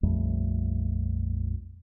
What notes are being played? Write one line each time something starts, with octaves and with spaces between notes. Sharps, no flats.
A#1 F2 G3 A3